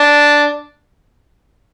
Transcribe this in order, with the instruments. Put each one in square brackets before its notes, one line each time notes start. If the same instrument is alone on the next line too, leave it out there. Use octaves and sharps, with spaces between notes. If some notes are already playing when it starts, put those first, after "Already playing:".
Already playing: [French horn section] D4